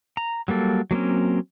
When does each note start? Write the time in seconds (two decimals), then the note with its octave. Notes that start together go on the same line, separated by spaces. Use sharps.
0.17 A#5
0.48 F#3 G3 A#3 A4
0.91 F#3 A#3 C4 C#4